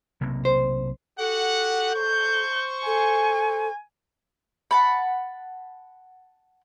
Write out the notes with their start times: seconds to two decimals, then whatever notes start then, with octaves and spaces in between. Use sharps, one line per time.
0.21 B1 C3 A#3
0.45 C5
1.19 F#4 G4 A4 F#5
1.94 C5 C#6 G6
2.86 A4 G#5
4.71 F#5 A5 B5